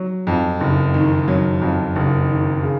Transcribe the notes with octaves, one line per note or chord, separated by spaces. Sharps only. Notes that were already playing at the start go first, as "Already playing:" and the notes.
Already playing: F#3
F2
F#1
D#3
F#3
F2
F#1
D#3
C#3